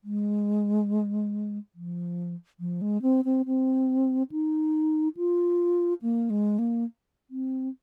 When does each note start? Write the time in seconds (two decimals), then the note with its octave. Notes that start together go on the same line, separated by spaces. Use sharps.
0.04 G#3
1.75 F3
2.60 F3
2.82 G#3
3.02 C4
3.25 C4
3.46 C4
4.32 D#4
5.17 F4
6.02 A#3
6.30 G#3
6.59 A#3
7.30 C4